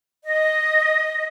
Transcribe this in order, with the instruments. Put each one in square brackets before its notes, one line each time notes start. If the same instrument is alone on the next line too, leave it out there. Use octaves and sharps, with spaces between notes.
[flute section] D#5